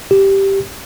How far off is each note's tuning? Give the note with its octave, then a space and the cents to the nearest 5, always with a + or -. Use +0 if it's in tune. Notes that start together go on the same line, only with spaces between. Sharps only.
G4 -5